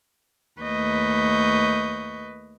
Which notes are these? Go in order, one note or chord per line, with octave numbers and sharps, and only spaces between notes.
D#2 A3 B4 D#5 C#6 G6